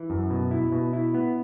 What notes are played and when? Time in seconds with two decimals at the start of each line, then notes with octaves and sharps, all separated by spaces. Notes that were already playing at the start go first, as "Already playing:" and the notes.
Already playing: E3
0.10 F#2
0.30 B2
0.51 E4
0.72 B2
0.93 E4
1.14 B3